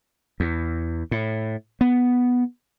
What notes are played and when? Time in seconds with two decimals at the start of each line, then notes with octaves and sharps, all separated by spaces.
0.40 E2
1.11 A2
1.81 B3